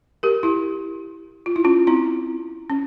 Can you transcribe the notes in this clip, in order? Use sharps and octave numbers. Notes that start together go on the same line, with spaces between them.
G4 A#4
E4 G4
F4
E4
C#4 F4
C4 E4
C#4